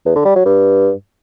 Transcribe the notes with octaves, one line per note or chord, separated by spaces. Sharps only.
E2
D3
G3
F#3
G2